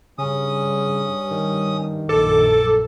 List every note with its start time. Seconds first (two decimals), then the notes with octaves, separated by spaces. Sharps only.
0.18 G2 C#3 C#4 D#6
1.31 D#3
2.09 A#1 F#2 A4 D6